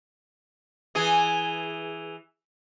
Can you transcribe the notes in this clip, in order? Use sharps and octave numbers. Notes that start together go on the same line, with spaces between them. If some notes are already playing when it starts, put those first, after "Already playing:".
E3 G#4